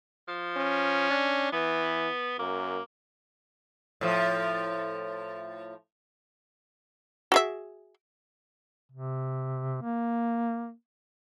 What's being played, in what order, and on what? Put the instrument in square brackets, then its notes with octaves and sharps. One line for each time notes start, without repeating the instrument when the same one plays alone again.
[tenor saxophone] F3
[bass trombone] C#4
[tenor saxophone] D4
[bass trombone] E3 [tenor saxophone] B3
[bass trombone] F#2 [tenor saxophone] A#3
[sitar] A2 F3
[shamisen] F#4 G#4 E5
[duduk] C3
A#3